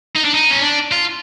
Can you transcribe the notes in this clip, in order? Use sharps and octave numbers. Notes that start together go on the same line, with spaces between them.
D#4
D4
D#4
C#4
D4
F4